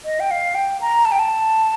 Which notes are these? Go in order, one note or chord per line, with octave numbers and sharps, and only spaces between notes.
D#5
G5
F5
G5
A#5
A5
G5
A5